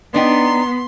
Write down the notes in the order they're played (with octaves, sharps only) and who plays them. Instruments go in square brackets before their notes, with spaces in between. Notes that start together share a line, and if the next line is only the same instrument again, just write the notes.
[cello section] B3 [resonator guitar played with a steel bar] D4 D#4 G5 [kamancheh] C6